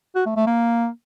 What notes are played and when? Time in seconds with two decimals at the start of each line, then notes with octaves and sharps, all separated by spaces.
0.15 F#4
0.26 A3
0.36 A3
0.47 A#3